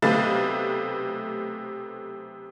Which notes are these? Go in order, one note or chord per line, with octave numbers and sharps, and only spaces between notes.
B1 C3 A3 B4 F5 A6